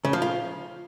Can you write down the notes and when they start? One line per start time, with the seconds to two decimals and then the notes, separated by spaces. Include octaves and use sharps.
0.05 C#3
0.13 F3
0.22 F4